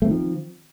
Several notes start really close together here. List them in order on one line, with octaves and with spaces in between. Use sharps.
A3 C4 D#3 F3